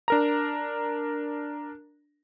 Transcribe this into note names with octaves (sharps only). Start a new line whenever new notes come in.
D4 A#4 A#5